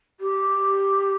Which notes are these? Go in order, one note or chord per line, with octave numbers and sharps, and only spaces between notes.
G4